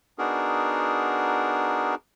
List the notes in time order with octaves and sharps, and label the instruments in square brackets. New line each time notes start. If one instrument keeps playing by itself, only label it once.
[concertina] B3 D4 D#4 F#4 G#4 A#4